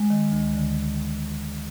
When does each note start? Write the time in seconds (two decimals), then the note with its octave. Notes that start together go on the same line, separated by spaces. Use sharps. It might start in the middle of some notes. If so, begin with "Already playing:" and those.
Already playing: G#3
0.10 D#3
0.32 D2
0.54 D3